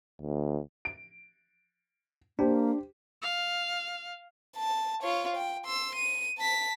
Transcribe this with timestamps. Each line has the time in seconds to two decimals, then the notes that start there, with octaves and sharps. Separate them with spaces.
0.22 D2
0.85 D7
2.39 A#3 D4 G4 C5
3.22 F5
4.57 A5
5.03 F4 C#5
5.36 G5
5.65 C6 E6
5.95 D#7
6.38 A5 B6